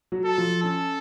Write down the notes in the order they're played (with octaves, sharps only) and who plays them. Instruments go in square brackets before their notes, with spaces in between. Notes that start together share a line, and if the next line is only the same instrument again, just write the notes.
[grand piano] F#3 F#4
[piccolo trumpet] A4
[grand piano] F3 F4
[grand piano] C#4 [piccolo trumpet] A4